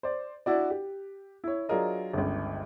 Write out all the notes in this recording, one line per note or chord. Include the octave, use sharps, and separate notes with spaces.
C5 D5
D4 E4 F#4 D5
G4
E4 C#5
F#3 D4 F4 G#4 A#4 D#5
G1 C#2